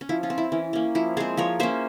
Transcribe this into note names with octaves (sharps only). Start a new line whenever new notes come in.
C#4
F3 E4
C#4 F4
C4
E4
E3 C#4
A#3 C#4
F3 E4
G#3 C4 G#4 C5
F3 A#4 C#5
A#3 C#4 C5 E5